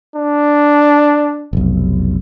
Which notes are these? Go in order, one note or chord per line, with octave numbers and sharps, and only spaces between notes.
D4
F1 B1